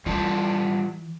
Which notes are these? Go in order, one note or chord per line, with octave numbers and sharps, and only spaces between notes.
E3 G3 F4 A5